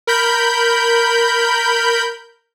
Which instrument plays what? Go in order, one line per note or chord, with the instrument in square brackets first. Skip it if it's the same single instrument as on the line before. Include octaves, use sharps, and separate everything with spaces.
[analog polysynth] A#4 B5 G6